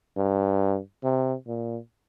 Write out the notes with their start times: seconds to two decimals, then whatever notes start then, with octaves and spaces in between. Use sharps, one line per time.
0.17 G2
1.03 C3
1.47 A#2